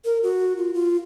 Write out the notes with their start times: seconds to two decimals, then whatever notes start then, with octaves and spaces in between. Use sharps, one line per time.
0.05 A#4
0.23 F#4
0.57 F4
0.74 F4